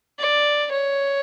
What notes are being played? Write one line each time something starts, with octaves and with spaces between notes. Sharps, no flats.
D5
C#5